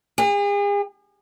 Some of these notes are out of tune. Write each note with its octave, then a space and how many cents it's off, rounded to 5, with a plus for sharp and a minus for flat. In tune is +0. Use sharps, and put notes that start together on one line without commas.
G#4 -40